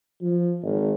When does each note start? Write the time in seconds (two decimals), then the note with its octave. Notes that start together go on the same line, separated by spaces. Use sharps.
0.21 F3
0.63 G#1